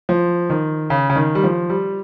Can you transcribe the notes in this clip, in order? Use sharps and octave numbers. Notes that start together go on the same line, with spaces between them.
F3
D#3
C#3
C#3
D#3
G3
F3
G3